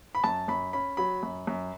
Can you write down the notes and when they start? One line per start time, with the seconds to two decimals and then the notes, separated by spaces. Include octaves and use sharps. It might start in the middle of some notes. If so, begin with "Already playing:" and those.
0.15 B5
0.24 F#2 A5
0.48 F#2 B5
0.73 C#4 B5
0.97 F#3 B5
1.23 F#2
1.47 F#2